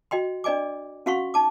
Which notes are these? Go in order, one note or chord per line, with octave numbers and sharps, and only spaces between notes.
F#4 D#5 G5 C6
D4 D5 D#5 G#5 D6
C#4 F#4 F5 F#5 C6 C#6
D#4 A5 D6